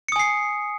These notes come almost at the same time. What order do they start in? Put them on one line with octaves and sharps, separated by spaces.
C#7 D#6 G#5 C7